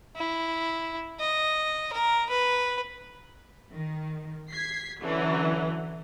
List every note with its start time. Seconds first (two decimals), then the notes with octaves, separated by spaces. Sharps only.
0.17 E4
1.20 D#5
1.93 A#4
2.30 B4
3.73 D#3
4.51 G#6 B6 C7
5.01 D3 E3 F#3 C#4